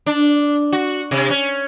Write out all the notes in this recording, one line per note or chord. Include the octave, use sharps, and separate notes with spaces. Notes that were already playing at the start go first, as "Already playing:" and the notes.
D4
F#4
C3
C#4